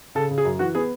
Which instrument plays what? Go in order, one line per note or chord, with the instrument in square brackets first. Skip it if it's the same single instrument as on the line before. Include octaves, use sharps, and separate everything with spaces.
[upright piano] C#3 [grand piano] A4
[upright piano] C#3
[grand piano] G#4
[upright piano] F#2
[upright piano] E3 [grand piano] F#4
[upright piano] B3 [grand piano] G#4